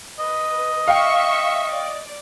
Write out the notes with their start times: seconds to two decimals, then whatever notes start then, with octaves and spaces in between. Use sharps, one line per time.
0.19 B4 D#5
0.88 E5 F5 G5 C#6
1.71 D5